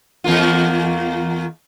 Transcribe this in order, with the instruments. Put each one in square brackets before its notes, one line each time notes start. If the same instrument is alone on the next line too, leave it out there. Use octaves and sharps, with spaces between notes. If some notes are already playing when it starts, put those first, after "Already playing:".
[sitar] E2 A#3 F4